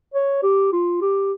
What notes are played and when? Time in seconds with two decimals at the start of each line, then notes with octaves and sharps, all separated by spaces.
0.14 C#5
0.42 G4
0.73 F4
1.01 G4